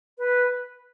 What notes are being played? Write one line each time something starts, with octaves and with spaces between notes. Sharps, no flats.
B4